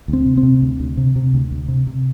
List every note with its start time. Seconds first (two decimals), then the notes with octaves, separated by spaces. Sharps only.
0.08 D2
0.13 C4
0.25 C3
0.37 C4
0.43 C3
0.62 D2
0.80 D2
0.97 C3
1.16 C3
1.34 D2
1.51 D2
1.68 C3
1.87 C3